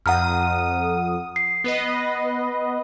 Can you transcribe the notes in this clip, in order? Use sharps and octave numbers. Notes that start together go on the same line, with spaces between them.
F2 F#5 A#5 D#6 F6
C7
B3 B4 D#5